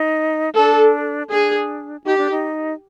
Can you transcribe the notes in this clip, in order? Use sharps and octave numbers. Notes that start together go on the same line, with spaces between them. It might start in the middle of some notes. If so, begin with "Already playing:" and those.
Already playing: D#4
D4 A4
D4 G#4
D#4 G4
D4
D#4